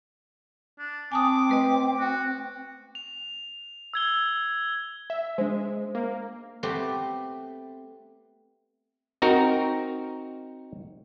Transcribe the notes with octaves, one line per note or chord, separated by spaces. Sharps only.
D4
C4 G#5 A5 D6 D#6
A3 B4 D#5
F#4
F7
E6 G#6 G7
E5
G#3 D4 C5
A#3
A3 B3 C4 G4 B4
C4 D#4 F#4 A#4